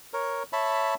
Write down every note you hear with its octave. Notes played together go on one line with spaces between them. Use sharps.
A#4 C#5
C#5 E5 A5 B5